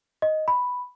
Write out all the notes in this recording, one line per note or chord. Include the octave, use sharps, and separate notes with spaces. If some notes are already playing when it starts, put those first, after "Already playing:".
D#5
B5